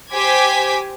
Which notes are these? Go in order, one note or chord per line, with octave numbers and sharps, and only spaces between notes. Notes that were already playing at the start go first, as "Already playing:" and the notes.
G4 C5 G#5 D6 G#6 B6